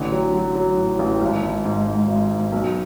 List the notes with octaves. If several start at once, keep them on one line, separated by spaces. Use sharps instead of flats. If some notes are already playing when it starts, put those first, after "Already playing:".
Already playing: A1 D3
F#3
F#3
F#3
A2
A1
G#1
G#1
G#2
G#2
G#1
G#2
B1